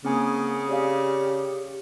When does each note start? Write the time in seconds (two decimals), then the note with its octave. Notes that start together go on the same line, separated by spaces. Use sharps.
0.05 C#3 A#3 C4 G#5 D#6
0.68 G4 C#5 D5 F5